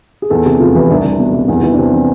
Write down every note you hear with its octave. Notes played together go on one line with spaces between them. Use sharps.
G#4
E2 A4
C3 G#4
F1 F4
E3 E4
C2 D4
C2
B2
C2
E2
E3
D4
C3 C4
E3